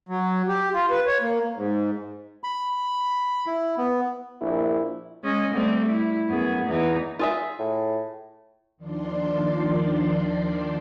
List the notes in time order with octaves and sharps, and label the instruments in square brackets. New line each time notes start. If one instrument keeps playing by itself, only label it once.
[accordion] F#3
G4
F4
B4
C#5
A#3
G#2
[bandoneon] B5
E4
B3
[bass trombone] A#1 [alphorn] E4
[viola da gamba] G#3 C#4 D#5
G3 A3 C4
E4
F#2 B3 G#4
E2 E3 D#4
[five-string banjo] F4 G#4 E5
[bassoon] A2
[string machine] D#2 D#3 F3 D4 D5 C6